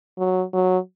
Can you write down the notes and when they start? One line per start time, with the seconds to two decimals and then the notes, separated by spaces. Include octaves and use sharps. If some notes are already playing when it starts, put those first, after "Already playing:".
0.18 F#3
0.53 F#3